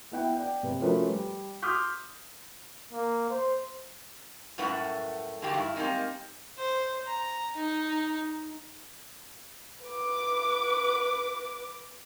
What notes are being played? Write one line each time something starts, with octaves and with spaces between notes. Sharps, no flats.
B3 E4 F#5 G5
D5 G5
C3 B4
F3 A3 C#4 F#4 A#4 B4
G3
C6 D6 D#6 F6 G6 B6
A#3
C5
F#2 A2 G3 A3 B4 F#5
D3 F#3 G#3 A3 G4
G2 E4
G3 G#3 A#3 C4 D#4
C5
A#5
D#4
B4 D6